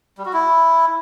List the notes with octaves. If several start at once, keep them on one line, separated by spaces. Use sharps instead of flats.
G3
F#4
E4